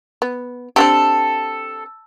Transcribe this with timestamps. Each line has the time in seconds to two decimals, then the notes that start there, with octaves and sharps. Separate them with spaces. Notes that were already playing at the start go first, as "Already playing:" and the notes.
0.22 B3
0.76 C4 D4 G4 A4